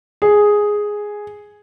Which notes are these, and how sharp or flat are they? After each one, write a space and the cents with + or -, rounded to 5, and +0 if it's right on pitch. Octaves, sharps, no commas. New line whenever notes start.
G#4 +0